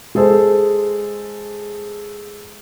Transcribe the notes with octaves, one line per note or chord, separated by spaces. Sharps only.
G#3 G#4 A4 C5